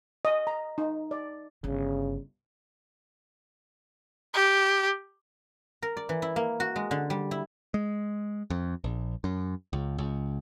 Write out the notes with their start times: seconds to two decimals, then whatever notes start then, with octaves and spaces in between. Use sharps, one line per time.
0.25 D#5
0.47 A#5
0.78 D#4
1.11 D5
1.64 G1 C#3 D4
4.34 G4
5.82 A#4
5.97 D5
6.09 E3
6.22 E4
6.36 A#3
6.60 F#4
6.76 G#3
6.91 D3
7.10 G3
7.31 E4
7.74 G#3
8.50 F2
8.84 A#1
9.24 F#2
9.73 C#2
9.98 C#2